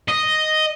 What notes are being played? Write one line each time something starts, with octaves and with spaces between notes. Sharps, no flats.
D#5